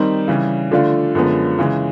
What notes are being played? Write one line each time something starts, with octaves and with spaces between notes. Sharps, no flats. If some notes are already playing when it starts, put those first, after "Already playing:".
Already playing: D#3 G3 C4 D#4
C#3 E3 G3
D3 F3 A3 D4 F4
F#2 D3 F3 G#3 B3
C#3 E3 G#3